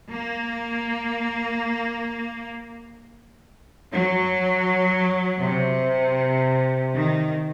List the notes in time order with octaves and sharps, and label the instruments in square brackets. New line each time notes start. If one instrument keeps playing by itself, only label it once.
[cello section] A#3
F#3
C3
D#3